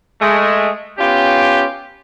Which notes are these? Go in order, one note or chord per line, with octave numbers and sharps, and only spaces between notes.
G#3 A3
B3 C#4 F4 G4